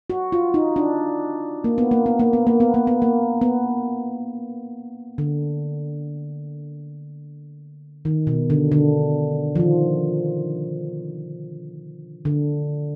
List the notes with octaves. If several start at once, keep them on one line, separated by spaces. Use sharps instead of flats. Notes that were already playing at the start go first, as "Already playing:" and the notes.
F#4
F4
D#4
D4
A#3
B3
A#3
B3
A#3
B3
A#3
B3
A#3
B3
A#3
B3
D3
D#3
B2
D3
D3
F3
D#3
D3